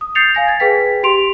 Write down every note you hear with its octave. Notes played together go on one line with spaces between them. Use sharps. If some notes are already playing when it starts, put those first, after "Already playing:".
D#6
G6 A6 C7 C#7 F7
F5 G#5 A#6
G#6 A6
G#4 B4 G5 B6
G4 C6 D7 F7